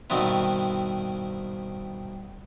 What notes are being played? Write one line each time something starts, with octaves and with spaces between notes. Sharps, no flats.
G2 B2 D#3 C4 E4